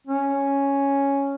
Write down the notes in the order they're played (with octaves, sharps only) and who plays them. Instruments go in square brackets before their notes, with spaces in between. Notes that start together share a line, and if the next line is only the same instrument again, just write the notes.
[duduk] C#4